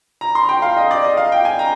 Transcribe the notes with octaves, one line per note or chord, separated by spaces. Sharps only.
A#5
C6
G5
F5
D#5
D5
D#5
F5
G5
G#5
A#5